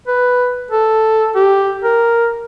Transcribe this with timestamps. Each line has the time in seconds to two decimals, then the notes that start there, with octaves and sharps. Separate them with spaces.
0.07 B4
0.71 A4
1.35 G4
1.84 A#4